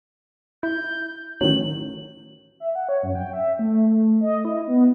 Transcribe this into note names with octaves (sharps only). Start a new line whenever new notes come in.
E4 G6
A1 D#3 F#3 F#7
E5
F#5
C#5
F#2
G5
E5
A3
A3
D#5
E4
B3